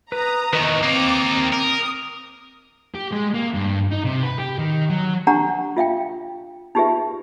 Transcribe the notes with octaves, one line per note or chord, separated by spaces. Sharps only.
B4 A#5 D#6
E2 D#3 B4 D#5 C#6
A#3 C4 D#4 D6
A#4 D#6
G4
G#3
A#3
G2
D#4
C3
B4
G4
D#3
F#3
D4 G4 F#5 A#5
F4 E5 F5 G5
D#4 F4 G4 G#4 B4 E5